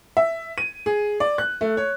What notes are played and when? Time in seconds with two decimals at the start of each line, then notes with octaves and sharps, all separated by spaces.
0.17 E5
0.58 D#7
0.86 G#4
1.20 D5
1.38 F#6
1.61 A3
1.77 C#5